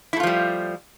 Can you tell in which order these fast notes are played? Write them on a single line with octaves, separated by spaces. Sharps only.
E4 A3 F4 F3 G3